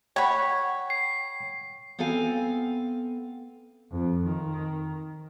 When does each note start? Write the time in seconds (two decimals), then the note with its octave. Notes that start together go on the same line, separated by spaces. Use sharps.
0.16 C#5 F#5 G5 B5
0.90 C7
1.99 B3 C4 A4 F5 G#5
3.92 F2
4.26 D#3